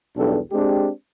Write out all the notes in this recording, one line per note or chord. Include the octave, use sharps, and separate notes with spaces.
B1 E2 G3 D4 G4 A4
G#3 C4 D4 G4